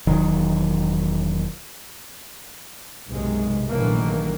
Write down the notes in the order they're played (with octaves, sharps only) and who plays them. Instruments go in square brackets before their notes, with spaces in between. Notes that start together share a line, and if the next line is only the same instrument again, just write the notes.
[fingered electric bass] E1 D#3 F#3
[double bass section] B1 F#2 C3 G#3
A#1 D#3 E3 F#3 A3 A#3